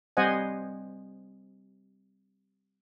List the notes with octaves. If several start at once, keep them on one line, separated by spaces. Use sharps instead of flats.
G3 C4 C5 D#5 F#5 G#5